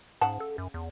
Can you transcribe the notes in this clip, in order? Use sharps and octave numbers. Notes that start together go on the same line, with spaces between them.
G#2 C#3 F#5 A5
A4
F#2
E2